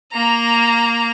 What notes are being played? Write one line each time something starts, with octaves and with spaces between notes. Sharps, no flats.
A#3 A#5